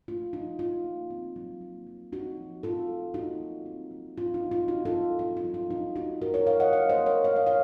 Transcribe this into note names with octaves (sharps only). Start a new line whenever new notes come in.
A3 F4
F3 D#4
C#4 F4
A#3
C4
F#3
A#3
F#3
C4 D#4 F#4
F3
C4 F4 A4
A3
A#3 D#4 F#4
F#3
C4
F#3
C4 F4
D#4
F#3
F4
C4 D#4 F#4
F4 A4
F#3
C4 F4
F4
F#3
F4
C#4 D#4
A3 D#4 F#4
A3 F#4 A#4
A#4 C#5
F3 C#5 F5
D#5 F#5
A#3 C#5 F5
C5 D#5
F#3
A#4 C#5
A3 F5
D#5
C#5 F5